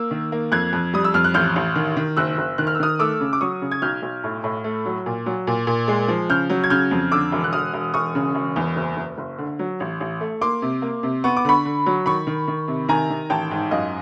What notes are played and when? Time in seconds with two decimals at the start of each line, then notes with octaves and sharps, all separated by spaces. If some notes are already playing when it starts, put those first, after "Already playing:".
Already playing: A#3 E6
0.11 D#3
0.32 A#3
0.52 F2 F#6 G#6
0.73 F2
0.94 G3 D#6
1.04 E6
1.14 F2 F6
1.24 F#6
1.34 A1 F6 G6
1.56 A1
1.75 D#3
1.97 D#3
2.17 F#1 E6 F#6
2.38 F#1
2.58 D#3 F#6
2.67 F6
2.75 E6
2.80 D#3 D#6 F6
2.99 A3 D6 E6
3.20 C#3
3.33 D6
3.41 F#3 C#6 D#6
3.62 C#3
3.72 G#6
3.82 B1 F6 G6
4.02 B1
4.24 A2
4.44 A2
4.64 A3
4.86 F#3
5.06 A#2
5.26 F#3
5.47 A#2
5.67 A#2
5.88 G#3
6.08 F3
6.29 C#3 F6 G6
6.50 F#3
6.64 G#6
6.70 C#3 F6 G6
6.91 F2
7.11 D3 D6 E6
7.32 E1
7.44 F#6
7.53 E1 D#6 F6
7.74 E1
7.94 E1 C#6 D#6
8.15 C#3
8.35 E1
8.56 E2
8.76 F#1
8.97 F#1
9.18 F#1
9.38 D3
9.59 F#3
9.80 A1
10.00 A1
10.21 A3
10.41 A#3 C6 D6
10.62 C3
10.82 A#3
11.03 C3
11.24 B3 C#6
11.37 D6
11.45 D3 B5 C#6
11.65 D3
11.86 F#3
12.06 D#3 B5 C#6
12.27 D#3
12.48 D#3
12.68 C3
12.88 D#3 G#5 A#5
13.10 D#3
13.30 A1 G5 A5
13.51 G#2
13.71 F#2 D#5 F5